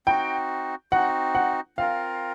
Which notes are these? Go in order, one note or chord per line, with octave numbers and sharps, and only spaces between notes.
C4 D#4 F#4 G5
C4 D#4 F#4 F#5
F#5
C4 F4 A#4 F5